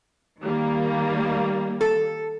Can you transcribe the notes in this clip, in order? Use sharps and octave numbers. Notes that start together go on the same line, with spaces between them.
D#3 G3 A#3
A4